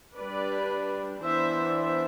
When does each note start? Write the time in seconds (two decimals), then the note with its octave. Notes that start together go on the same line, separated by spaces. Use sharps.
0.17 G3 D4 B4 D5
1.23 E3 B3 D4 C5 E5
1.76 C5 E5